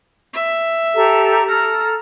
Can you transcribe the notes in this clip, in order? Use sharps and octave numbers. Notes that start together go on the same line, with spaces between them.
E5
G4 A4 A#5
A4 A#5 F6